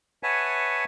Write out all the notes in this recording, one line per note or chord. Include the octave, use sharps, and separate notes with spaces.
B4 C#5 E5 F#5 G#5 A5